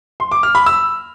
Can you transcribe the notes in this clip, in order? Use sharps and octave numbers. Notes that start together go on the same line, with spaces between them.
C6
D6
F6
B5
E6